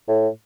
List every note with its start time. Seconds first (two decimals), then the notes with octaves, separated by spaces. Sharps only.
0.08 A2